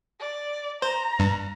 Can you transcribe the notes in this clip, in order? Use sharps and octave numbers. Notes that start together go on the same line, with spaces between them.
D5
C5 A#5
G2